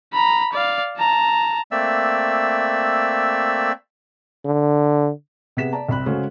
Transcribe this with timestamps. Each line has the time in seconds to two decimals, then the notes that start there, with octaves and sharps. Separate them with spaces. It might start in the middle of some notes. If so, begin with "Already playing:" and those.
0.13 A#5 B5
0.53 D5 F5
0.98 A5 A#5
1.71 A3 A#3 C4 D5 E5 E6
4.45 D3
5.57 C3 B3 G#4 B6 E7
5.72 D5 A5 A#5
5.89 C2 C4 B5 F#6
6.06 C#3 G#3 C#4 F#4 A4 C5